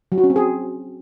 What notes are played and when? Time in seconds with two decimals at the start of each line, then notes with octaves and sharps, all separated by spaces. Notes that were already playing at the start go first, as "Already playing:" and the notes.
0.12 F#3
0.18 F#4
0.24 C#4
0.30 C4
0.36 G#4